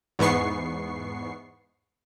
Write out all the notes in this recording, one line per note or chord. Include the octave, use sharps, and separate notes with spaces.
E2 G#2 B3 C#6 C7